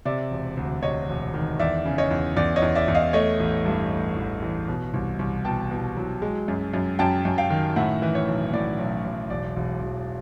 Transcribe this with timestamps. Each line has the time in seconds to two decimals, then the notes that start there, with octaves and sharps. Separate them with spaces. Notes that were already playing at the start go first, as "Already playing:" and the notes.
0.05 C3 D5 E5
0.31 E1
0.57 D2
0.82 C3 C#5 D#5
1.09 E1
1.34 D#3
1.59 E2 D5 E5
1.85 C#3
1.98 C#5 D#5
2.11 E2
2.36 E2 D5
2.56 C#5 D#5
2.62 E2
2.75 D5 E5
2.88 E2
2.95 D#5 F5
3.13 A3 C#5 D#5
3.40 A1
3.65 G2
3.91 A3
4.16 A1
4.43 E3
4.68 B2
4.94 C2
5.19 C2
5.45 B2 G5 A5
5.71 B2
5.97 F#3
6.22 G#3
6.48 F#2
6.73 F#2
6.99 F#2 G5 A5
7.25 F#2
7.38 F5 G5
7.50 D#3
7.76 A2 E5 F#5
8.02 E3
8.15 C#5
8.28 B1
8.53 A2 D5
8.79 B1
9.05 B1
9.30 E1 D5
9.56 E1
9.82 E1